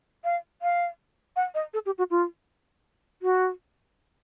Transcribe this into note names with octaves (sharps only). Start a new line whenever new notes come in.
F5
F5
F#5
D#5
A4
G4
F#4
F4
F#4